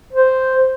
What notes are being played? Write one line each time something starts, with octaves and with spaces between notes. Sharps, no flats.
C5